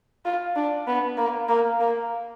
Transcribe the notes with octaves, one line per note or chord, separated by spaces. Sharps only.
F4
D4
B3
A#3
A#3
A#3